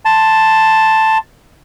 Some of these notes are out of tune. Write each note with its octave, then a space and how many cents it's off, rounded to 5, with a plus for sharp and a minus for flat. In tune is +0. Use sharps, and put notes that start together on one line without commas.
A5 +0 C6 +0